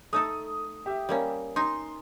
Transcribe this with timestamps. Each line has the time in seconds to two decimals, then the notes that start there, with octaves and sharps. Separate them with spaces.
0.13 A3 D#4 A4 D#6
0.86 G4 E5
1.09 G3 A#3 C#4
1.56 D#4 G#5 C6